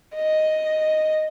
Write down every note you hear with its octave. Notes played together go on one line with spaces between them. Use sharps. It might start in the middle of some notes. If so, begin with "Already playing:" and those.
D#5